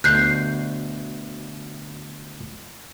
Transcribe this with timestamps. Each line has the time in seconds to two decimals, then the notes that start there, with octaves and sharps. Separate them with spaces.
0.04 D2 B2 A4 F#6 G6 C7